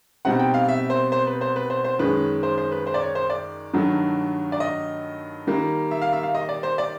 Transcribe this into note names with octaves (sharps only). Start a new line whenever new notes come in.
B2 G3 C4 D#4 F#5
G5
F5
E5
C5
C5
B4
C5
B4
C5
C5
F#2 D#3 G#3 C#4 B4
C5
C5
B4
C5
D5
C#5
C5
D5
G2 D#3 F#3 A3
D5
D#5
D#3 G3 A#3
E5
F5
E5
F5
D#5
D5
C5
D5